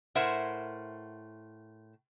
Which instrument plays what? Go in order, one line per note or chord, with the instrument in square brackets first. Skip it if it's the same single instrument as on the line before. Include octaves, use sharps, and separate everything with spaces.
[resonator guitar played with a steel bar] A2 A#4 C5 E5 F#5